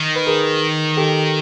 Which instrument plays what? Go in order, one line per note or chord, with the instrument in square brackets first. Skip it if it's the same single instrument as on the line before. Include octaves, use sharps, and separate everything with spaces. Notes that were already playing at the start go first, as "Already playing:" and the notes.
Already playing: [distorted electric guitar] D#3
[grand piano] B4
G#4 A#4
G4 A4